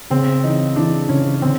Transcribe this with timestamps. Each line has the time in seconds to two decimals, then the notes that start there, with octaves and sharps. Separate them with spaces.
0.10 C#3 C4
0.44 E3 D#4
0.76 E3 D4
1.09 C#3 C#4
1.42 D3 C4